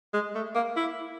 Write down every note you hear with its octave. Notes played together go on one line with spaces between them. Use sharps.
G#3
A3
A#3
E4